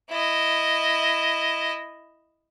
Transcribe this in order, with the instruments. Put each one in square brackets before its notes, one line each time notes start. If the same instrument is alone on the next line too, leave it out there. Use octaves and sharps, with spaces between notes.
[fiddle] E4 D#5